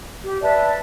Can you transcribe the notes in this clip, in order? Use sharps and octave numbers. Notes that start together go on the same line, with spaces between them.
G4
B4 D5 E5 A5